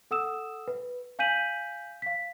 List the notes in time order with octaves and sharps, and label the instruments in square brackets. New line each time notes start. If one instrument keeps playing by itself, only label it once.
[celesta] A4 F#5 D#6 E6 E7
B4
F5 G#5 G6 B6 D#7 F#7
F5 B6